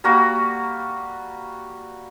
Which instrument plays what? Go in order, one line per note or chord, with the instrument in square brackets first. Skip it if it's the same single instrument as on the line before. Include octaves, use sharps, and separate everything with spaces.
[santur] G3 A#3 F#4